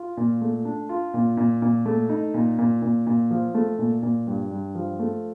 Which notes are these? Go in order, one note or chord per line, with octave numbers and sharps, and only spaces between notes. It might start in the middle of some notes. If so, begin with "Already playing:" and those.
Already playing: F4
A#2
A3
D4
F4
A#2
A#2
A#2
A3
D#4
A#2
A#2
A#2
A#2
F3
A3
A#2
A#2
G2
G2
F3
A3